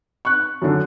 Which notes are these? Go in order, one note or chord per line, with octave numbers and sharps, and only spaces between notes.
C#6 F#6
F#2 D3